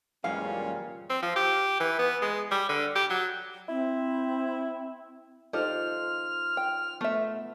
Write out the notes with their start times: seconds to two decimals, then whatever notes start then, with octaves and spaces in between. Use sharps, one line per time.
0.24 F#2 A#2 E3 G3 G#3 C#4 F5
1.10 C4
1.23 F3
1.36 G4
1.80 E3
1.99 B3
2.22 G#3
2.51 G3
2.69 D3
2.95 G4
3.10 F#3
3.69 C4 E4
5.53 D#4 F4 G4 A4 C5 D#5 F6
6.57 G5
7.01 A3 B3 E5